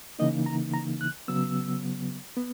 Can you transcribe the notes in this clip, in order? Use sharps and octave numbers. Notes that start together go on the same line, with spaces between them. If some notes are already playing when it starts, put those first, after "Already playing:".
C#3 E3 A#3 D#4 D#5
A#5
A#5
F#6
C#3 F#3 B3 E6
B3